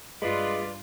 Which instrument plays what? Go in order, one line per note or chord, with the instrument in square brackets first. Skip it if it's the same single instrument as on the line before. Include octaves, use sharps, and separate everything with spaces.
[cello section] G2 F4 [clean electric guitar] G#3 [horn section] B4 D5